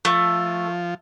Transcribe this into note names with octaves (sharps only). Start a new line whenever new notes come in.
F3 A3